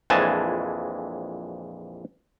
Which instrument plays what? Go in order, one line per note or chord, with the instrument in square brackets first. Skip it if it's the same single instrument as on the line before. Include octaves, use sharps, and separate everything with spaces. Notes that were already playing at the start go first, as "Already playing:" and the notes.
[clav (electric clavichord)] A#1 F2 E3 G#3 G#5 A5